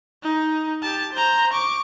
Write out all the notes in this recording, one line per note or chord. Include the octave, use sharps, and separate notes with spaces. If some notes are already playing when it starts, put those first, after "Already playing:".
D#4
G4 A5
C5 A#5
C#6 D6